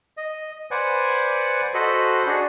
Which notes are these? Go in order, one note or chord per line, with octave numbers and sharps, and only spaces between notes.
D#5
B4 C5 D5 F#5 G#5
F#4 A4 C5 D#5 B5
D4 F#4 G#4